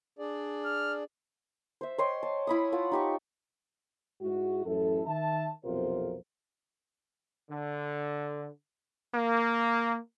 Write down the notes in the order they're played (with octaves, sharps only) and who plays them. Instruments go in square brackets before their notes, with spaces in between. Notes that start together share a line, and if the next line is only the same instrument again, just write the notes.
[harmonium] D4 G#4 D5
[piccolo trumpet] F6
[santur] C5 E5
C#5 D#5 G5 C6
A5
E4 B5 D#6
F4 F#5 A5
D#4 G4 C#6
[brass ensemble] G#2 G#3 E4 F#4
A1 F#2 E4 A4
D#3 E5 A5
B1 F2 C3 F4 A#4 C5
[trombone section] D3
A#3